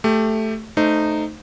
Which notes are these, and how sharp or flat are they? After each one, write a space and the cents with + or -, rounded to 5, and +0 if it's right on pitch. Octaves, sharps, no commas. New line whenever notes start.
A3 +0 G4 +10
A3 +0 D#4 -15 C5 -10